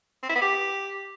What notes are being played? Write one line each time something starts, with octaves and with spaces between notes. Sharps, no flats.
C4
E4
B3
G4